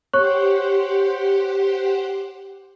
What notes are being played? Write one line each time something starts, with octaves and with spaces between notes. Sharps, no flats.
G4 C5 C#5 F#5 C#6 F#6